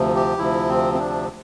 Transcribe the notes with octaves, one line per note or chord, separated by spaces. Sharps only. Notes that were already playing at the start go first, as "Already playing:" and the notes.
Already playing: D2 C3 F3
G4
D2 C3 F3 E4
C4
C4
D4